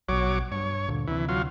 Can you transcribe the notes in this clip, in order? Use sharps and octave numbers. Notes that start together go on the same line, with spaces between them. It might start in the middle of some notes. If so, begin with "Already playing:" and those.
A#1 B2 F#3 C#5 D6
G2 C#5
D2 A#2 D3
D2 C3 E3
F#3 F4